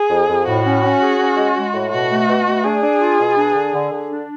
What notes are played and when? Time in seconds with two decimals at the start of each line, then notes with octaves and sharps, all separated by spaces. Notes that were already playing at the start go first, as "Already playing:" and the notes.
Already playing: G#4
0.11 F2
0.28 F2
0.47 A2 F#4
0.65 C#4
0.84 C#4
1.01 G#4
1.19 C#4
1.37 G#3
1.56 G#3
1.74 A2
1.92 B2 F#4
2.10 A3
2.28 B2
2.46 A3
2.64 D4 G#4
2.83 D4
3.01 F4
3.19 B2
3.37 D4
3.55 D3
3.73 D3
3.92 D3
4.10 D4